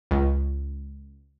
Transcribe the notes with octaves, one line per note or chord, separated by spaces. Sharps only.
C#2